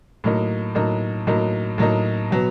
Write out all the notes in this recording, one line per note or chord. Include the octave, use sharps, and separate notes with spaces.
A2 F#3 A#3 D#4
A2 F#3 A#3 D#4
A2 F#3 A#3 D#4
A2 F#3 A#3 D#4
B2 F#3 B3